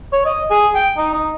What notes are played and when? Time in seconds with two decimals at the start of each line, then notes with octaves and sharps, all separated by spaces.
0.13 C#5
0.25 D#5
0.51 G#4
0.75 G5
0.97 D#4
1.14 D#4